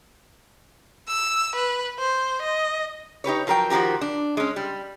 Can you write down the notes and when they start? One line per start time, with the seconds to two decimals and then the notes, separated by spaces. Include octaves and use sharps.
1.08 E6
1.56 B4
1.99 C5
2.42 D#5
3.24 D#4 G4 B4 C#5
3.47 F3 F#3 A#4 C5 G5
3.70 D#3 F3 F#4 G4 A#4
4.01 D4
4.37 G#3 C#4
4.56 G3